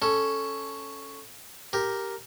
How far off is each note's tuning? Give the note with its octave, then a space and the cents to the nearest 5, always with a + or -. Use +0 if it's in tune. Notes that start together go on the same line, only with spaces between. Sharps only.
C#4 +0 A4 +0
G4 +0 A#4 +0